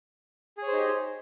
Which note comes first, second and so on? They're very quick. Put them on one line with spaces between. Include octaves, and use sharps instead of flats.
G#4 C#5 C5 D#4 G4